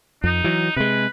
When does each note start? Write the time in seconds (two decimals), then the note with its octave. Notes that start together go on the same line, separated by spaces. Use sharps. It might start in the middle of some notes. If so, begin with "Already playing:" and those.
0.24 F2 D#4
0.44 E3 F#3
0.76 C3 G#3 B4